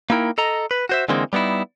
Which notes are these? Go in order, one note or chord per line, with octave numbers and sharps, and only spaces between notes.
A#3 D#4 E4 A#4 G5
A4 D#5 A#5
B4
F#4 C5 E5
D3 E3 G#3 A#3 C4 D#4
G3 B3 D#4 E4